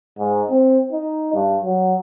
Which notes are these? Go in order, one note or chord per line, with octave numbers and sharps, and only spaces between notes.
G#2
C4
D#4
G2
F#3